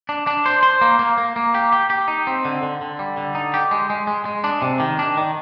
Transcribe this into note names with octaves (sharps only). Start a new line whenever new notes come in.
D4
D4
C5
C5
A#3
A#3
A#3
A#3
G4
G4
G4
D#4
C4
D3
D3
D3
G3
D3
D#4
G4
G#3
G#3
G#3
G#3
D4
C3
D#3
D4
D#3